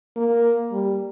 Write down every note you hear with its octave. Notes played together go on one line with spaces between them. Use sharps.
A#3
G3